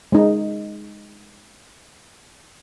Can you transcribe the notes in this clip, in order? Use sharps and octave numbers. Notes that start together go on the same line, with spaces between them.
G#3 D#4